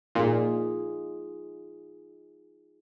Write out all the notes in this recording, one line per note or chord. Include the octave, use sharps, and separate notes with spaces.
A#2 D#4 F4 G#4